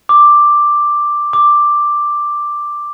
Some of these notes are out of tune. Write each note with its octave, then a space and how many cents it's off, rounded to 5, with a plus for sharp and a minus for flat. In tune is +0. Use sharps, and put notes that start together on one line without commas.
D6 +5
D6 +5